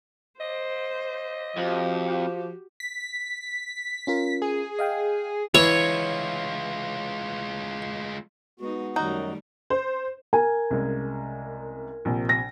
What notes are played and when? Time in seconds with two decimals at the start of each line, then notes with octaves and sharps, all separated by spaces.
0.40 C5 D#5
1.57 F2 F3 F#4 G4
2.80 B6
4.07 C#4 F4 A#4
4.42 G#4
4.79 D#5 F5 G5
5.54 E3 G#3 E4 F4 C#5
8.60 G#3 B3 D#4 F#4
8.96 F#2 D#3 F#3 G3 A3 D#4 F#4
9.70 C5
10.33 A#4 G#5
10.71 C2 C#3 G#3
12.05 A#1 C3
12.29 A#6